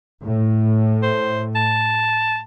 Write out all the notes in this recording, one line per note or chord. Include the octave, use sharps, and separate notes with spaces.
A2
C5
A5